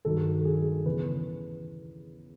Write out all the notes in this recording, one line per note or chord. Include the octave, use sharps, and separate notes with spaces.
G2 D#3 F#3 A4
G#4
E2 C#3 E3 B4